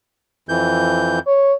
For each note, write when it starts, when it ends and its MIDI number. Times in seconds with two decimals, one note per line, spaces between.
0.49 1.19 41
0.49 1.19 52
0.49 1.19 91
1.27 1.53 73